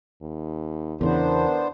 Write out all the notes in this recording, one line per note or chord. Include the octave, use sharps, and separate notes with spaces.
D#2
E2 C#3 E3 B3 D4 A#4 C5